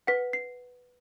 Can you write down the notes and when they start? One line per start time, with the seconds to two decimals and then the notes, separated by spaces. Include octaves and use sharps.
0.07 B4 F#5 B6
0.33 C7